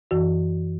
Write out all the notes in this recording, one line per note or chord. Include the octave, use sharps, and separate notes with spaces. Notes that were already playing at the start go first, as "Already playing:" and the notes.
F#2 E3 F#4